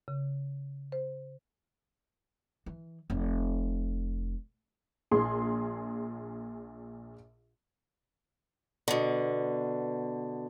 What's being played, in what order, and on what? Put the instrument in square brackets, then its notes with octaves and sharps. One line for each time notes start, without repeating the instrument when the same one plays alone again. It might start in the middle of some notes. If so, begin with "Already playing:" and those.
[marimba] C#3
C5
[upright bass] E3
F1
[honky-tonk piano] A#1 A#2 G#4 C6
[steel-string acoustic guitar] B2 D3